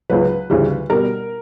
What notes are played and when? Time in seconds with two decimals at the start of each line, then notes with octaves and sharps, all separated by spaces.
0.10 C#2 C#3 F#3 B4
0.50 D2 C#3 E3 G3
0.90 B2 G3 A#4